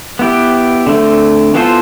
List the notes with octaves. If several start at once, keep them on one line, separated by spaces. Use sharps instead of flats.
B3 E4 G4
D3 A3 C4
E3 B3 F4 A4 C5